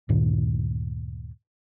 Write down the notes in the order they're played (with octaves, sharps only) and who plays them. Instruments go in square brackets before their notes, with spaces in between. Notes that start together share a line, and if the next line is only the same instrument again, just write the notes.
[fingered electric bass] D2 G2 A#2 D#3